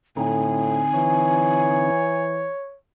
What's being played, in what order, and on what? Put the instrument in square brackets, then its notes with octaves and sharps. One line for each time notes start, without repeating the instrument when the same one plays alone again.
[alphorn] A2 [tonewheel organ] D3 C4 D#4 [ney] G#5
[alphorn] E3 [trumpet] C#5